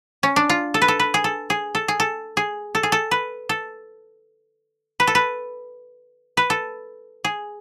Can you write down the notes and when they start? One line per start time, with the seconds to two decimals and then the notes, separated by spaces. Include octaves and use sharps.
0.23 C#4
0.36 D4
0.49 F4
0.74 A4
0.82 B4
0.88 A4
1.00 B4
1.14 G#4
1.24 A4
1.50 G#4
1.75 A4
1.88 G#4
2.00 A4
2.37 G#4
2.75 A4
2.83 G#4
2.92 A4
3.11 B4
3.49 A4
5.00 B4
5.07 A4
5.15 B4
6.37 B4
6.50 A4
7.25 G#4